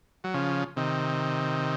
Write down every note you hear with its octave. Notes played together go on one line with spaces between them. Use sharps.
F#3
C#3 F3
C3 D#3